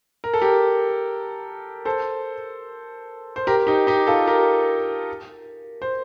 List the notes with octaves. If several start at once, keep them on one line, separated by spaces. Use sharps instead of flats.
A#4
A4
G4 A#4
A4 C5
C5
G4 A#4
D#4 G4
D#4 G4
F4 A4
G4 A#4
C5